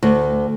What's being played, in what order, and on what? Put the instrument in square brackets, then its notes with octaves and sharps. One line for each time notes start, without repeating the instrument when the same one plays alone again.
[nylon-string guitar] D2